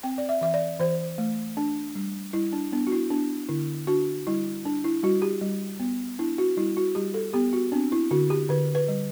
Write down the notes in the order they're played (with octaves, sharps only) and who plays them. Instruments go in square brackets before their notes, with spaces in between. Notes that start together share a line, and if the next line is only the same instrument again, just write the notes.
[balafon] C4 G5
D5
E5
E3 E5
D5
E3 C5
A3
D4
G3
G3 E4
D4
B3 D4
F#4
E4
B3 D4
D3 E4
D4 F#4
G3 E4
D4
E4
G3 F#4
G4
G3
B3
D4 E4
F#4
G3 E4
F#4
G3 G4
A4
B3 G4
F#4
C4 D4
E4
D3 F#4
G4
D3 B4
B4
G3